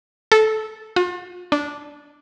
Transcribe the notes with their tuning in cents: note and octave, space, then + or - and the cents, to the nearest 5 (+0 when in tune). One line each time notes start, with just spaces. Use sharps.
A4 -15
F4 +40
D4 -10